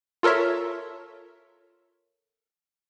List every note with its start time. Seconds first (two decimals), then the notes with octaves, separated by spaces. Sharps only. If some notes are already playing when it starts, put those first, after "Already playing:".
0.23 F4 A4 A#4 C#5 E5